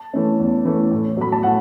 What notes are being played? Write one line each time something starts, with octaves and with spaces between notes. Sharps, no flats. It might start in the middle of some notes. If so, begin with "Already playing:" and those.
Already playing: A5
E3 A3 C#4
E2
E3 A3 C#4
A2
F#3 A3 B5
A5
A2 F#5